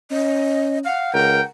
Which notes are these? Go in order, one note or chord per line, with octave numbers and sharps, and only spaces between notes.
C#4 D#5
F5 F#5
C#2 A#4 G5